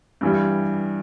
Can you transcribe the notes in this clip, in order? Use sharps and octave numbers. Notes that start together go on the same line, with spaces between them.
G2 E3 G3